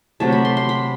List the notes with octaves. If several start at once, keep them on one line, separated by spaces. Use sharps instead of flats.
C3 F#3 A3 A5
B5
C6
C6
B5